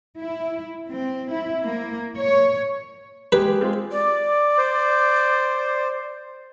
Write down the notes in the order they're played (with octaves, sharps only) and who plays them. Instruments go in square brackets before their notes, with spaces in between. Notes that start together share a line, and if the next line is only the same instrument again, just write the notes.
[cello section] E4
C4
E4
A#3
C#5
[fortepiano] G#3 G4 [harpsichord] B4
[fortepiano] G#3 C4 F4
[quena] D5
[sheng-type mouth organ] C5